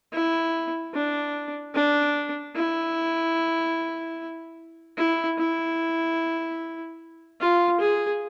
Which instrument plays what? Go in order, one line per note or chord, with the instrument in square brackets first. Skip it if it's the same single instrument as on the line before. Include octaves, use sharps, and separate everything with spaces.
[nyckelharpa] E4
D4
D4
E4
E4
E4
F4
G#4